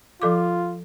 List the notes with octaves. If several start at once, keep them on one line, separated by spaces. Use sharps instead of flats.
F3 F4 A4 D6